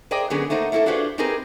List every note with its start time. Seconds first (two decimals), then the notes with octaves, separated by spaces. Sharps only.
0.11 G#4 A#4 C5 D5 D#5 G5
0.30 D3 F#3 B3 C#4 G#4 A#4
0.50 A3 A#3 D#4 C5 F#5
0.72 A3 A#3 E4 G#4 A4
0.86 D4 F4 F#4 G#4 B4 C5
1.18 C4 D#4 G4 G#4 A#4 B4